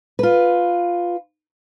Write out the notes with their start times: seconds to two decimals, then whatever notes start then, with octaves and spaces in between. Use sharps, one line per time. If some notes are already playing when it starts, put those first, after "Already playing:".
0.19 F4 B4